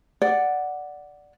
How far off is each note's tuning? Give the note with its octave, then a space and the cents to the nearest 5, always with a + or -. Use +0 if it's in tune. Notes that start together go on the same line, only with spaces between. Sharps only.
D5 +0 F#5 +0